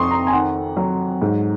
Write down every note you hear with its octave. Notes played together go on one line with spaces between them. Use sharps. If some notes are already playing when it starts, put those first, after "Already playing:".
Already playing: F2 C6 C#6 D#6
A#5
G#5
D#3 F#5
F#3
G#2